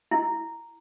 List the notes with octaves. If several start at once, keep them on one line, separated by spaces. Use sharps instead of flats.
E4